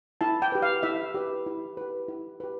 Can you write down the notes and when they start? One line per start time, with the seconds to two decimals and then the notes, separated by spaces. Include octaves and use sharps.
0.21 E4 A5
0.42 G5
0.52 G4 B4
0.62 F5
0.83 E4 E5
1.14 G4 B4
1.46 E4
1.77 G4 B4
2.08 E4
2.40 G4 B4